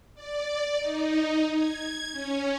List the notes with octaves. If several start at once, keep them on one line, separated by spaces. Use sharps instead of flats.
D5
D#4
G#6
C#4